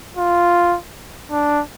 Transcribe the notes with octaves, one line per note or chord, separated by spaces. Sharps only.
F4
D4